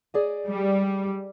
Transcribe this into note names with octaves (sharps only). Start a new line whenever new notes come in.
G#4 D5 D#5
G3